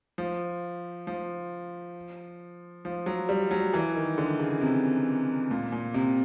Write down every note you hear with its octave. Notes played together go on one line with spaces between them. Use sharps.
F3
F3
F3
F#3
G3
F#3
E3
D#3
D3
C#3
C3
A#2
A#2
C3